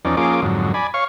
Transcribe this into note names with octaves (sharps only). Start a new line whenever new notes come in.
E2 F3 C#4 D#4 D5
F3 A#3 C#4 F4 G#4 D6
F2 G#2 D3 F#3
D5 G#5 B5
C#5 F5 C#6